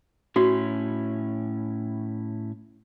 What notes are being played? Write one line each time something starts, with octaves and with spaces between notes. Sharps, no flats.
A2 C#4 E4 F#4